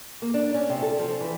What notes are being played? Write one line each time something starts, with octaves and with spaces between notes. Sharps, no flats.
A#3
D4
C#4
C3
A4
F3
E3